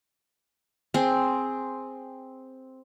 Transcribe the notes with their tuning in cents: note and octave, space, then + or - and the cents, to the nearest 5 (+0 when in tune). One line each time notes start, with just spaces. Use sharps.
C4 +0 G#4 +0